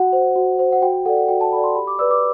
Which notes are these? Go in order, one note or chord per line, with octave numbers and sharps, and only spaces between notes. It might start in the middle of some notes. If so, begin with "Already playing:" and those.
Already playing: F#4 F#5
C5
F#4
C5
F#5
F#4 G5
A4 D5 F#5
F#5
F#4 G5
A5
A4 D5 B5
C6
G4 B5
D6
B4 D5 E6
D6